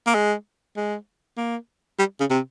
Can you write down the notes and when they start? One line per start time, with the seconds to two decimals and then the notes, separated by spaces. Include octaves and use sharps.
0.07 A#3
0.15 G#3
0.77 G#3
1.37 A#3
1.99 G3
2.20 C#3
2.30 C3